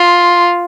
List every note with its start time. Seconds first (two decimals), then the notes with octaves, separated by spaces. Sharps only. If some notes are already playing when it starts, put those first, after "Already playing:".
Already playing: F4